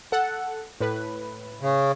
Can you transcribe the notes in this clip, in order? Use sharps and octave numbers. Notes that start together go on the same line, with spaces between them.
A4 F#5
A2 B4
C#3